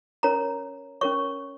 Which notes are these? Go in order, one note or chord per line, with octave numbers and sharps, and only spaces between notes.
C#4 A#4 C#5 A#5
C#4 A#4 C#5 C#6